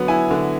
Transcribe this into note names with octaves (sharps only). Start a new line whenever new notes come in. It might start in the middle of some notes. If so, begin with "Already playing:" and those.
Already playing: D3 F#3 B3
E4 G#5
D3